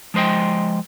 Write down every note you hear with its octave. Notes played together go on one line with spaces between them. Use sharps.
F3 G#3 C5 D#5 G5